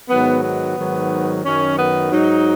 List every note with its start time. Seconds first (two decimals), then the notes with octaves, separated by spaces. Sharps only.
0.09 G#2 D#3 F#3 B3
0.43 B3
0.77 G#2 D#3 F#3
1.44 F#2 D#3 F#3 C#4
1.78 B3
2.12 G#2 F#3 D#4